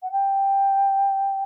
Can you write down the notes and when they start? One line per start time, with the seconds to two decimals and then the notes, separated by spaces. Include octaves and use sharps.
0.02 F#5
0.12 G5